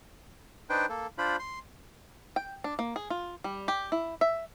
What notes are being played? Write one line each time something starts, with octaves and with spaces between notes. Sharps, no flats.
D4 D#4 B4 C5 G5
A#3 A4
D4 F4 C5 B5
C6
G5
D4
A#3
G#4
F4
G3
G4
E4
E5